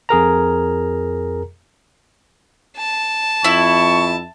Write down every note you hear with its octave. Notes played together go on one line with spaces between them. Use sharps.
F2 G#4 A#4 A#5
A5
F2 E4 C#6